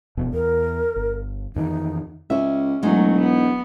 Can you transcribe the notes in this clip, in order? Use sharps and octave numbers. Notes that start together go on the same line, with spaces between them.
E1 F2 B2
E2 A#4
G1
F2 D#3 E3 D#4
C#2 C#4 E5
E1 F#3 G#3 A3 D#4
B3